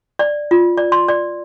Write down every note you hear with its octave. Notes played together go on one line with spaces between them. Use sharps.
D5
F4
D5
C6
D5